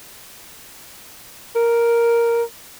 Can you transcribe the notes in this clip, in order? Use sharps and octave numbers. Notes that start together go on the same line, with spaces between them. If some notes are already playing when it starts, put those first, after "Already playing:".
A#4